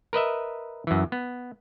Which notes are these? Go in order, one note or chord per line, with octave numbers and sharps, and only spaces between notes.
A#4 B4 D#5 E5
F#2 E3
B3